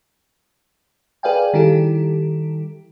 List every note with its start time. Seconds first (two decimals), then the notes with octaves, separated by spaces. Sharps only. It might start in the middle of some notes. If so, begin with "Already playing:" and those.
1.23 G#4 B4 D5 F5 G5 G#5
1.54 D#3 G3 E4 G4 A4